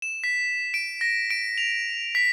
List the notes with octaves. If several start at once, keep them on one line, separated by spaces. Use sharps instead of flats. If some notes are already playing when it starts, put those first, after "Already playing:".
E7
B6
D7
A#6
D7
F7
B6